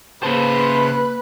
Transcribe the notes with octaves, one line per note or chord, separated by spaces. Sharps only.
C#3 A#3 B4 C5 A5